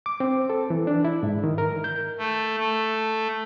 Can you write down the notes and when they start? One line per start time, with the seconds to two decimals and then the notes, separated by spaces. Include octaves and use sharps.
0.06 D6
0.20 C4
0.50 A4
0.70 E3
0.87 D4
1.05 E4
1.23 G#2
1.44 D#3
1.58 A#4
1.84 G6
2.18 A3
2.58 A3